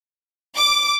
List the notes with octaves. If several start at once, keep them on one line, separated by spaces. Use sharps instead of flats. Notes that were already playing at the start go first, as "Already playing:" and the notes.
D6